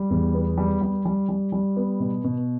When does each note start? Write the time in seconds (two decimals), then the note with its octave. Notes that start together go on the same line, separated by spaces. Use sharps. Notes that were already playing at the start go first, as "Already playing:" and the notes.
Already playing: G3
0.10 E2
0.34 B3
0.58 G3
0.82 G3
1.05 G3
1.29 G3
1.52 G3
1.76 B3
2.00 B2
2.24 B2